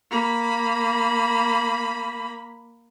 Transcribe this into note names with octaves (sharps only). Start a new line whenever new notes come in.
A#3 B5